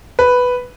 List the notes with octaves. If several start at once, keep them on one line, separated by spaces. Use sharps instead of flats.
B4